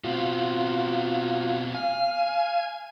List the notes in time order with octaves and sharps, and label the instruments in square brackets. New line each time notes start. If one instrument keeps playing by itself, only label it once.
[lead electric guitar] B2 C4 [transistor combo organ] F4 F#4
[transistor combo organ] F5 [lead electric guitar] G#5